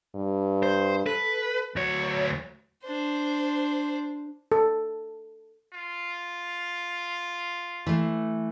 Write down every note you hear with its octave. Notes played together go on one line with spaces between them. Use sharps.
G2
C5
A4 B4
D2 F#3 C#5
D4 C5
A4
F4
E3 A3